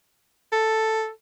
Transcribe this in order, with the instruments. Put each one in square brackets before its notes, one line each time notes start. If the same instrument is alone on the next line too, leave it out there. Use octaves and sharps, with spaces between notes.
[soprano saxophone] A4